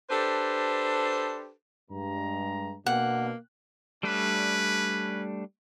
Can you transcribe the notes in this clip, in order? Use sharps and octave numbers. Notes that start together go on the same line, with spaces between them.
D4 G4 A4 B4 C5
G2 G#3 A#5
B2 A#3 B3 D4 F#5
G3 A3 C#4 D4 B4